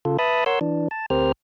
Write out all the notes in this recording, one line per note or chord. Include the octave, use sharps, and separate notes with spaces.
C#3 F4 A4
B4 E5 A5 B5 D#6
A#4 C#5 F#5 C6 E6
E3 D4
A5
D2 C4 G4 A#4 C5 F6